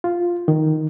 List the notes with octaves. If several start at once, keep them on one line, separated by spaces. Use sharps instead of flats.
F4
D#3